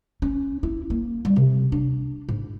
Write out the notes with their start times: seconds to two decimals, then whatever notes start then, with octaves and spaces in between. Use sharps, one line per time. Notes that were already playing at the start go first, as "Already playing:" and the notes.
0.22 C#4
0.63 E4
0.90 A#3
1.25 G3
1.36 C3
1.72 D4
2.29 G#2